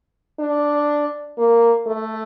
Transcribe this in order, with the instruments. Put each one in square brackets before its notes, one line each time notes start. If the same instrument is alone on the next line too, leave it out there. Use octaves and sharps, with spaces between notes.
[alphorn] D4
A#3
A3